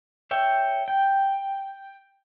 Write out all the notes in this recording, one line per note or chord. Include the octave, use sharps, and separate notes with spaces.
C#5 E5 G5
G5